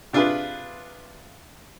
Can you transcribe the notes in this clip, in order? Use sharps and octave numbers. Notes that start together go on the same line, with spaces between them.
C3 D4 F4 G#4 B4